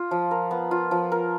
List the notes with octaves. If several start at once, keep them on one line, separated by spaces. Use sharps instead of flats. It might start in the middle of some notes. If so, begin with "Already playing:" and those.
Already playing: F4
F3
A#4
B3
F4
F3
A#4